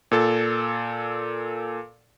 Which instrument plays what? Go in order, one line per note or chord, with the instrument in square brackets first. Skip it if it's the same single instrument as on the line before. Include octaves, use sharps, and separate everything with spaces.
[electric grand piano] A#2 A4 A6